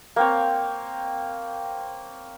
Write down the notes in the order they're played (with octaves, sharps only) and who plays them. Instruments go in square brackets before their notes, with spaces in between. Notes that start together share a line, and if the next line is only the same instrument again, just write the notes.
[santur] A#3 C4 C#5